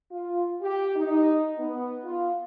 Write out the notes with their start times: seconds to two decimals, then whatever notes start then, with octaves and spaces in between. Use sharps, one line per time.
0.12 F4
0.62 G4
0.96 D#4
1.59 B3
2.04 F4